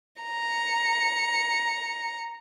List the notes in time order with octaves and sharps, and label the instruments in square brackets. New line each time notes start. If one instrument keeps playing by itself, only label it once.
[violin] A#5 C#7